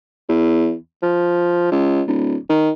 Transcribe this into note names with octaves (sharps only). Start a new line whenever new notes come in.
E2
F3
C#2
D1
D#3